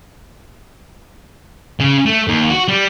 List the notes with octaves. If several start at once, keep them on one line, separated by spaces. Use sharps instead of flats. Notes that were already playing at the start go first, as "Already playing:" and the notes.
C#3
A3
D#2
F#4
G3